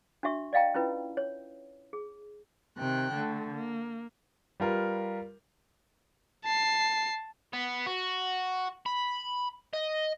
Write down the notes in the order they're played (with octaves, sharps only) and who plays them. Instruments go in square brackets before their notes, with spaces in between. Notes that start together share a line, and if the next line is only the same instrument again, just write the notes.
[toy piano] D4 F#4 E5 C#6
D5 D#5 F5 G5 A#5
C#4 E4 F4 B4
C#5
G#4
[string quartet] C3 D#3 G5 F#6
D3 A3
A#3
[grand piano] G3 F4 A#4 B4
[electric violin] A5 C7
[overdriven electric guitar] B3
F#4
B5
D#5